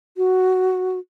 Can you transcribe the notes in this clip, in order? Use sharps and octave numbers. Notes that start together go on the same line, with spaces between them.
F#4